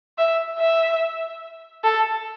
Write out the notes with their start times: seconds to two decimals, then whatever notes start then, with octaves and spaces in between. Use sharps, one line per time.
0.18 E5
0.59 E5
1.84 A4